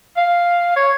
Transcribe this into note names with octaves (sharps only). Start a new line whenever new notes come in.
F5
C#5